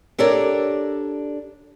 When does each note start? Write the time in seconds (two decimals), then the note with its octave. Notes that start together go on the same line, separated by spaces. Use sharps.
0.18 D4 G4 A4 A#4 C#5 D5